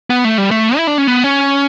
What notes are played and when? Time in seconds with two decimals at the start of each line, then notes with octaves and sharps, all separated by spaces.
0.10 B3
0.25 A3
0.38 G3
0.51 A3
0.77 E4
0.87 D4
0.98 C#4
1.07 B3
1.24 C#4